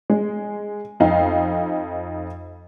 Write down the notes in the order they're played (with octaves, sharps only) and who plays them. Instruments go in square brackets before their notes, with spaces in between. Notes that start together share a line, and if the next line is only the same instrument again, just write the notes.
[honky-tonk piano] G#3
F2 D#4 F5